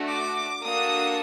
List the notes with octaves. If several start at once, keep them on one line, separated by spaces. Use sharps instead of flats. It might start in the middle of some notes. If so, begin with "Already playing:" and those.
Already playing: A3 D4 F#4
D6
A#3 D4 F#4 A4 D#6